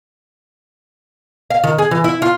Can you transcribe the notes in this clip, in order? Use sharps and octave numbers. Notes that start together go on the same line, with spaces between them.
F5
D#3
G#4
E3
E4
F4